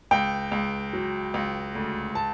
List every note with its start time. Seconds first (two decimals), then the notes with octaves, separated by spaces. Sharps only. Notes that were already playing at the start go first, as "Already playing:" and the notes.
0.11 C#2 G5
0.52 C#2
0.93 F#3
1.34 C#2
1.75 D2
2.15 A5